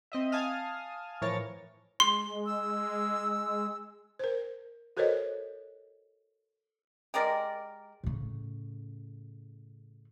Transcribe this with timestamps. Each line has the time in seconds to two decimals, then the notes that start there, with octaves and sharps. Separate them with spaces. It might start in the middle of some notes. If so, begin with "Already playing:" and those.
0.12 C4 D#5 E5
0.32 F5 G#5 A5 D#6 F6
1.22 A2 E3 F3 A#4 C#5 A6
2.00 G#3 C6
2.46 E6
4.19 A#4 C5
4.97 F#4 A4 A#4 C5 C#5 D#5
7.14 G#3 G4 A#4 D5
8.04 A2 C#3